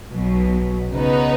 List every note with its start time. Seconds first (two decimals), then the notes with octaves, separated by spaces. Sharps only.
0.10 B1 B2 F#3
0.91 C#3 B3 D#4 B4